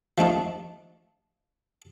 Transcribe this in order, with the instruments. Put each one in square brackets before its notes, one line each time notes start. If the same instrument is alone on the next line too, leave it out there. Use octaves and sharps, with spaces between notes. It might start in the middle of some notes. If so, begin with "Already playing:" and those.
[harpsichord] F3 A3 D4 D#4